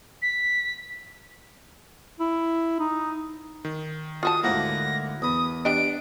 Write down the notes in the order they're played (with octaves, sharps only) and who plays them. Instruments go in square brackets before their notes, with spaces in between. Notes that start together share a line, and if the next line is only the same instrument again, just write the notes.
[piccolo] B6
[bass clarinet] E4
D#4
[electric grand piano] D#3
[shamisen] F4 F#4 A5 [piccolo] D#6
[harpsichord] D2 G#2 A#3 [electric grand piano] E4 A#4 F#5 [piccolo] A#6
[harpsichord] E2 B5 [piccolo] D#6
[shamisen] G3 D#5 [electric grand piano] B3 D4 [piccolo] D7